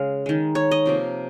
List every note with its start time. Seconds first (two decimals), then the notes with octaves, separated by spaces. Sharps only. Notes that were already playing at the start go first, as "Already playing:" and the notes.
Already playing: C#3 G#3 F5
0.26 D#3 G#3
0.55 C#5
0.71 D#5
0.86 C3 F3 A#3